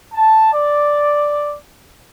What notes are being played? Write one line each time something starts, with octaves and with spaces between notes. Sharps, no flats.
A5
D5